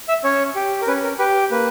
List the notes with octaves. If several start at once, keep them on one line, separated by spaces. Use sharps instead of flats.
E5
C#4 C#5
G4
A#4
C#4 B4
A#4
G4 B4
A#3 B4